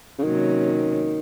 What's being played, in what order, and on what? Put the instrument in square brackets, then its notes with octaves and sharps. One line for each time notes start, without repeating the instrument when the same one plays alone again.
[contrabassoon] C#3
[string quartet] C3 F#3 A#3 C#4 [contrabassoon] D#3